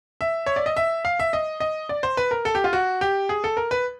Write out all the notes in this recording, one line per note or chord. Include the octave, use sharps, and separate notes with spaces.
E5
C#5
D5
D#5
E5
F5
E5
D#5
D#5
D5
C5
B4
A#4
A4
G4
F4
F#4
G4
G#4
A4
A#4
B4